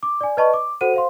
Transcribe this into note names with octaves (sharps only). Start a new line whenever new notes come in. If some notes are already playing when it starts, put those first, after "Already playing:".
D6
D5 G#5
B4 D5 D#5 A5 B5 C#6
D6
F#4 A4 C5 F#5 D#7
C5 F5 C6